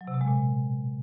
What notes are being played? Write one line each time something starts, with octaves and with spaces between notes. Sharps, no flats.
F#3
C3
B2
G#3
A#2